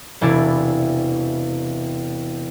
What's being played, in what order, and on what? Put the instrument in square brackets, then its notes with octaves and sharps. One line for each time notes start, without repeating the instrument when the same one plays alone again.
[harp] E1 C3 E4 D5 G#5